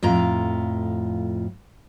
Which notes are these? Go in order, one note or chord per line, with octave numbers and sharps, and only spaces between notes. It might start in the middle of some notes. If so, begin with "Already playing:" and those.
F2 A2 F4 A#5